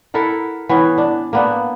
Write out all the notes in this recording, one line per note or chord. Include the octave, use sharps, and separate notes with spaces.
E4 A4 A#4 F#5
E3 B3 C#4
D4
A#3 B3 D4